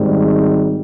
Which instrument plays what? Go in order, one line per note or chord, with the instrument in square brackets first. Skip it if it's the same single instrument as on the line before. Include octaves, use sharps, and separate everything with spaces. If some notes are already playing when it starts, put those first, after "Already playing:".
Already playing: [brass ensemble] G#1 G#2 G3